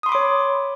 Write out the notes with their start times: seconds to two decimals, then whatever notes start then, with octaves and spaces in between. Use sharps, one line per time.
0.03 D#6
0.06 C6
0.09 B5
0.12 D6
0.15 C#5